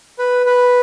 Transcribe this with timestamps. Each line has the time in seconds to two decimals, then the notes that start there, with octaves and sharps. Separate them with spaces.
0.19 B4
0.46 B4